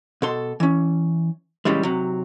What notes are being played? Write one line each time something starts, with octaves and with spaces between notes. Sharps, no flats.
B2 A4 C6
E3 C#4
A#2 C#3 E3 G3 G#3
C3 F#3